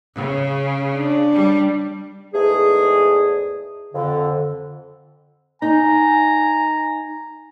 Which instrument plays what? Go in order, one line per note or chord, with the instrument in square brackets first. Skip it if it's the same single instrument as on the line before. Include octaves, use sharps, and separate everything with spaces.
[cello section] C#3
[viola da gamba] D4
[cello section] G3
[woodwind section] E2 G#2 A3 G#4
F2 D3
[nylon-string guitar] D#4 [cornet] G#5 [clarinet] A#5